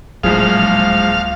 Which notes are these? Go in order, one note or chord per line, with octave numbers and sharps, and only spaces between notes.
D1 A#1 F3 F#3 G#3 G#4 F5